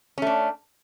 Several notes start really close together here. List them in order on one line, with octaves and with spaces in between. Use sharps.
C#4 A3 D4